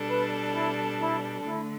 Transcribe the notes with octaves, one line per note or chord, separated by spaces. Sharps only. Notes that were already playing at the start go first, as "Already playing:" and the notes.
Already playing: B2 G3 D4 A4
B4
E4
E4
D3 A3 E4